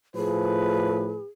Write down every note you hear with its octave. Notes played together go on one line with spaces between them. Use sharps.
A2 F3 G#4 B4